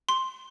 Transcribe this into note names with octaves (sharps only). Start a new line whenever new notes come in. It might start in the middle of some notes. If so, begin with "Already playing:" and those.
C6